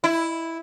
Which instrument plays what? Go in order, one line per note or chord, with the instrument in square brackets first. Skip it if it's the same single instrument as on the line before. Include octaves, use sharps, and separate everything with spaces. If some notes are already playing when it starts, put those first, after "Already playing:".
[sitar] E4